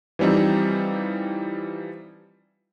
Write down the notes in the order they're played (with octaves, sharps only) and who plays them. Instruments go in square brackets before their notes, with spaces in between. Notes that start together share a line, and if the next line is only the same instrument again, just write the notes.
[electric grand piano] E3 F3 G3 C4 D#4